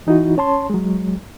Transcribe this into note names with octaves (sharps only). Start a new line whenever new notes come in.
E3 D#4 E4 F#4
C#4 C#5 A5 C6
F#3 G#3